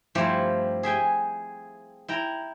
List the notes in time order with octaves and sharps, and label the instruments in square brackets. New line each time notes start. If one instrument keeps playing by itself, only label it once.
[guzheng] G2 F3 A3 C4 E4 G4
G#4 E5 G5 G#5
E4 G5 A#5